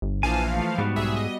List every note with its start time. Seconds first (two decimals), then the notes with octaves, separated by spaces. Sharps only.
0.02 G1
0.23 A#1 E3 F3 F5 G#5 A5
0.53 A3
0.78 G#2 G3 B3 F#4
0.96 B1 G#4 E5
1.16 D#5